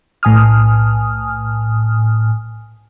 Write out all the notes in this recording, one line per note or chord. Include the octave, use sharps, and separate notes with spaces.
B1 A2 G#5 D#6 F6